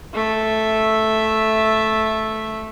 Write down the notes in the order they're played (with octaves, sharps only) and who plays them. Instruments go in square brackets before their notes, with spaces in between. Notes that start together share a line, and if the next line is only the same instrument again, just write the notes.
[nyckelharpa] A3 E5